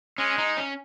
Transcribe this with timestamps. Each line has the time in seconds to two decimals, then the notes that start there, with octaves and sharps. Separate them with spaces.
0.18 G#3 C#4
0.38 D#4
0.57 C#4